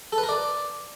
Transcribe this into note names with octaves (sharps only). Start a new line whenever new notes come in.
A4
B4
A#4
D5